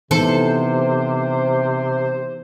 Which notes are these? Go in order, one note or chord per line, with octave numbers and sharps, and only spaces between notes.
C3 E3 B3 D#4 A4 C5